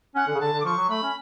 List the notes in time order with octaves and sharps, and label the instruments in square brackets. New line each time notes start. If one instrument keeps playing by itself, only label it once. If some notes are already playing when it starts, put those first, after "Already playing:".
[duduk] C#4 [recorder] F#5
[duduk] D3
C#3
[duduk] D3 [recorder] A5
[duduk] D3
[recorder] D6
[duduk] F3 [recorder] C#6
[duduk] F#3
[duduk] A3 [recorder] B5
[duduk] C#4